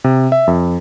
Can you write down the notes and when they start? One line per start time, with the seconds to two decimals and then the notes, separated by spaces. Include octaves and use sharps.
0.04 C3
0.32 E5
0.47 F2